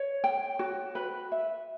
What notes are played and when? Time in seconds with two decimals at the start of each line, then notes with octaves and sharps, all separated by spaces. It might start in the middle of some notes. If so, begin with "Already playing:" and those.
Already playing: C#5
0.24 G5
0.59 F#4
0.95 B4
1.32 E5